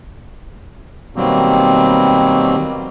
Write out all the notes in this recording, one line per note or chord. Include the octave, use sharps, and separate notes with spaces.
B2 D#3 F#3 G3 A#3 C4